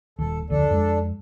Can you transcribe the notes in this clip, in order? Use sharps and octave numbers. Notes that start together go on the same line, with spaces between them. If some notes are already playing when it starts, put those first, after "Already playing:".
D#1 D#2 A4
F1 D2 D3 D4 A4
F2 G#3